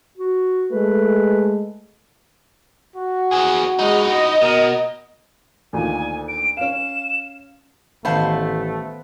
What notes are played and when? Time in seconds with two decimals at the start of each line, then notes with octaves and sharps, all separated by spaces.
0.17 F#4
0.72 G#3 A3 B4
2.96 F#4
3.31 B3 G#4
3.79 G#3 D#4 E4
4.08 D#5
4.41 B2 A#4
5.73 D2 A#2 D#3 G#5
6.28 D7
6.57 C#4 F5 E7
8.05 A1 D#3 A3 B3 C5 F5 A5 B5